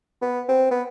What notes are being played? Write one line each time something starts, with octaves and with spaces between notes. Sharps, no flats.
B3
C4
B3